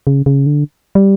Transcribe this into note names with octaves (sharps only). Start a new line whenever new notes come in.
C#3
C#3
D3
G3